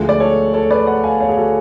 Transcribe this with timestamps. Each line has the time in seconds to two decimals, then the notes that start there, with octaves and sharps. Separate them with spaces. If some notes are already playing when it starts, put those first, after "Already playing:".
Already playing: D2 D3 F3 G#3
0.09 D5
0.20 A4 C#5
0.54 A4 C#5
0.71 B4 D5
0.87 D5 F#5
1.04 F5 G#5
1.20 C#5 F5
1.29 G#4
1.37 F#4 A4